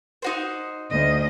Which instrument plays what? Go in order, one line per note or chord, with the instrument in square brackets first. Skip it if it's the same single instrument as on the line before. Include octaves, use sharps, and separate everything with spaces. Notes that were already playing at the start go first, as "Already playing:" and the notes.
[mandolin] D#4 F#4 C5
[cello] D2 D#5